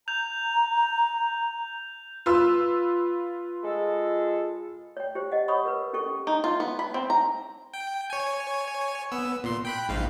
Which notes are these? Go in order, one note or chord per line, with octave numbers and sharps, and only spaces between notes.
A#5 G6 F7
F4 B4 E6
G#3 G#4 A4
C#5 G5
G4 C5
D#5 F#5
C#5 F#5 B5 C#6 D#6
A#4 B4
C#4 G4 A4 C#6
D#4
F4
B3
B5
C4
A#5
G5
C#5 G#5
B3 E6
A#2 C6
G5 B5 F#6
A#1 G#2 F5